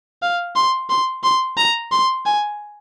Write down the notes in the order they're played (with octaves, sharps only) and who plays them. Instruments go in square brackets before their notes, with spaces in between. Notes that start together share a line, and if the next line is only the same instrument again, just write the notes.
[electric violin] F5
C6
C6
C6
A#5
C6
G#5